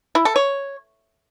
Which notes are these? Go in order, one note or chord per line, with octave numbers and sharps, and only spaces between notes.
E4
A4
C#5